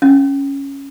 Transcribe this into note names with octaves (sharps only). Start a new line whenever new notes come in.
C#4